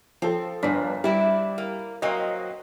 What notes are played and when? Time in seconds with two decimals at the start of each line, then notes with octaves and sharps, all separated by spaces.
0.22 F3 C4 A4
0.63 G1 F2 A#2 D4 B6
1.04 G3 C4 D4 E4
1.58 A#3
2.02 F#3 A#3 C4 D#5